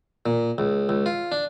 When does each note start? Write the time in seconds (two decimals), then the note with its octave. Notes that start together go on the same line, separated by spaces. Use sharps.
0.26 A#2
0.58 C#2
0.89 C#2
1.06 F4
1.32 D4